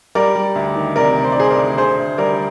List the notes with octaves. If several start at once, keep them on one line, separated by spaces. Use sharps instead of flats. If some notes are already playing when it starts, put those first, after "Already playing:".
G3 A#4 D5
G3
D2
D#3
C3 A#4 D5
C3
C5
D5
D#3 G#4 C5
A#4 D5
D2
D3 G#4 C5
D2
G3 A#4 D5